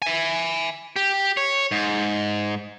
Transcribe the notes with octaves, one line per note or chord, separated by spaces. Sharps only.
E5 G#5
G4
C#5
G#2